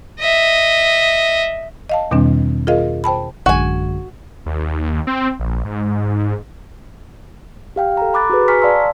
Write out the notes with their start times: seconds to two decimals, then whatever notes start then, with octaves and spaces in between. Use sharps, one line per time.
0.20 D#5 E5
1.89 D#5 F5 A5
2.11 E2 B2 D#3 G3 C4 D4
2.67 F4 G#4 A#4 D#5 F5
3.04 C5 G5 A5 B5
3.46 A1 F#2 D3 G#3 F#4 G#5
4.46 D#2
5.07 C4
5.40 A#1
5.65 G#2
7.76 G4 F5 G5 F6
7.97 A4 A#5
8.13 A#5 B5 D6 F#6 A6
8.30 F#4 G#4 B4
8.48 G#5 A#5 C#6 F6 B6
8.62 D5 F5 A5 C6 E6